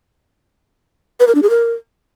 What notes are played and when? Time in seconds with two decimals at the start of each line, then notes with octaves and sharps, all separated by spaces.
1.20 B4
1.27 A#4
1.35 D4
1.42 G#4
1.50 A#4